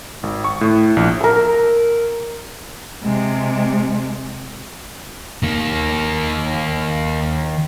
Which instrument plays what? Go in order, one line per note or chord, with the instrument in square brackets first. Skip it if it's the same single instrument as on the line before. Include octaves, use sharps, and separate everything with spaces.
[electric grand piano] G#1
C#6
A2
A#1
[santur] A#4 E6
[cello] C3 G#3
[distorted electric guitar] D#3 A#3